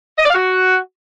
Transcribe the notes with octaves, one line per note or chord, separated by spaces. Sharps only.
D#5
D5
F5
F#4